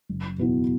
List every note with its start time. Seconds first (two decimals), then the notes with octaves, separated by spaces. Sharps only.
0.09 F#1
0.38 E2 B2 B3 E4